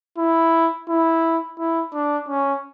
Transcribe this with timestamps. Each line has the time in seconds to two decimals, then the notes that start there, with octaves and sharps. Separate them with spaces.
0.18 E4
0.89 E4
1.59 E4
1.93 D4
2.29 C#4